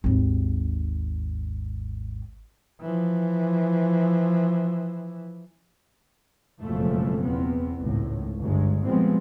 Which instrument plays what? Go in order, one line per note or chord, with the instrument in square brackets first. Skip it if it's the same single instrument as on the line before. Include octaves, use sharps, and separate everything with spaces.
[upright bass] G#1 D#2
[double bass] E3 F3
[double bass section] F#1 F2 B2 F3 G#3 A3
E2 B3 C4
G#1 C#2 A2
G1 G#3
A#2 F3 G3 G#3 B3 C4